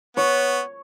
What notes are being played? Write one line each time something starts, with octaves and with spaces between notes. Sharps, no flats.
B3 C#5